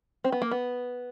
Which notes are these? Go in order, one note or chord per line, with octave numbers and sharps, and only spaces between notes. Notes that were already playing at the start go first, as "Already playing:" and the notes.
C4
B3
A#3
B3